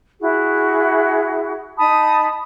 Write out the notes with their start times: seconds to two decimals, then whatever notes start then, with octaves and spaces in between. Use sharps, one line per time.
0.19 E4 F#4 G#4
1.78 D#4 A5 B5 D#6